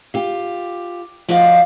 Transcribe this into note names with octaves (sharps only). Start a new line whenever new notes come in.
F4 G4
F3 F4 F#4 D5 D#5 F5